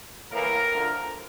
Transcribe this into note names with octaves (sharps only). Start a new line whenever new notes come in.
A2 E3 A#3 A#4
D2 D3 F3